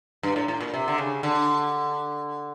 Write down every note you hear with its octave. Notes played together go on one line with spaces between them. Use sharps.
G2
A2
A2
A#2
C3
D3
C#3
D3